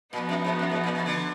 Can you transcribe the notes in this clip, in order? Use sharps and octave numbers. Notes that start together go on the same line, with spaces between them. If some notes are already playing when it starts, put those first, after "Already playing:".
A#2 F3 B3 D#4 F#4
F#2
G#2
F#2
G#2
A#2
B2
D3